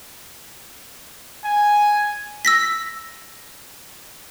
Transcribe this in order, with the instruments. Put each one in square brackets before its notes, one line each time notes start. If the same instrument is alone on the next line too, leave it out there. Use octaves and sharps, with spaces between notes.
[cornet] G#5
[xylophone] E6 A#6 B6